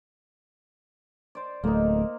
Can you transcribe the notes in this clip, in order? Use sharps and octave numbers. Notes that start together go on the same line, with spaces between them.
C5 D5
D1 A3 A#3 D#4